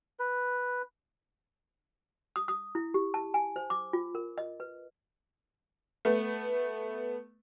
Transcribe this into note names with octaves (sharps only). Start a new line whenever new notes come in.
B4
D#6
D#6
E4
G4
A5
G#5
C5
D6
F4
A#4
D#5
B4
A3 B3